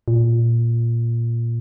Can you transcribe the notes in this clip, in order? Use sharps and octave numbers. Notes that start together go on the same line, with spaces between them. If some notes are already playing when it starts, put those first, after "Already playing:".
A#2